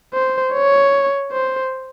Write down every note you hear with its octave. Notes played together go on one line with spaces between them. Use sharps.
C5
C#5
C5